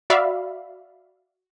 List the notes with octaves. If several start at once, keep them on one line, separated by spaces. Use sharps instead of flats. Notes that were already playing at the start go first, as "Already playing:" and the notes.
F#4 D5 E5 F5 B5